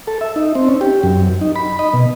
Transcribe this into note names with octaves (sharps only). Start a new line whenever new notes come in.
A4
E5
D#4
C4
C#4
G4
F#2
D#4
B5
D#5
B2